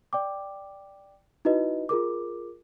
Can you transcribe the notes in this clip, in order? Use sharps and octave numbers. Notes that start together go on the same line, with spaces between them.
D5 G5 D6
D#4 E4 F#4 B4 D#5
F4 G#4 A#4 D6